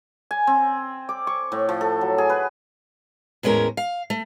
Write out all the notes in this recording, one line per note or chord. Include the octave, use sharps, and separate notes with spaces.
G#5
C4
D6
C#6
A2
F3
A4
F#3
G#4
B4
E2 A2 G#3 C#4 A#4
F5
A3